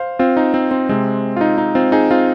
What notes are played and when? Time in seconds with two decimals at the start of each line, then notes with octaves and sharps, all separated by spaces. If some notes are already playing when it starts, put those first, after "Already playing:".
Already playing: C5 F5
0.19 C4 F4
0.37 D#4
0.54 C4
0.71 C4
0.89 C3 G#3 C4
1.36 F4
1.41 D#4
1.58 D#4
1.75 C4 F4
1.92 D#4 G#4
2.11 C4 F4